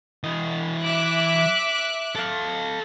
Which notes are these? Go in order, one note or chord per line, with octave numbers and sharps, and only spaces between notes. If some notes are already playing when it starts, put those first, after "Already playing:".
E3 D#5
E5 D6 F#6
A4 F5